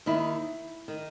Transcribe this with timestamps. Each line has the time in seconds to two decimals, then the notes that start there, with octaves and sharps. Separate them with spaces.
0.06 D#2 D#3 E4
0.88 D#3